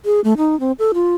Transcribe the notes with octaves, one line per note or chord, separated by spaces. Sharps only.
G#4
A3
D#4
C4
A4
F4